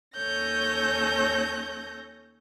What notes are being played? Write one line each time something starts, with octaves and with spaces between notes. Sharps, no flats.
D#2 C#4 A4 C#5 G6 A#6